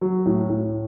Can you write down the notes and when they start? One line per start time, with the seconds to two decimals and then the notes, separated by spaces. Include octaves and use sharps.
0.01 F#3
0.26 A2
0.49 A2